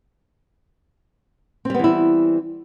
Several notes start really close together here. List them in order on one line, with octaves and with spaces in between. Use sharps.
C4 G3 B3 E3 E4